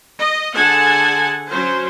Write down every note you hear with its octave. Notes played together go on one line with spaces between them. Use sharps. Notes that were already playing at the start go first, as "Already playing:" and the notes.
D#5
D3 G#4 F#5 G#5 A5
F#3 C#4 C5